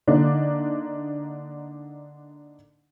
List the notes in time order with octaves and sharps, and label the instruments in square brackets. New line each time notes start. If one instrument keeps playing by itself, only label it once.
[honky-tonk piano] D3 A#3 D4 D#4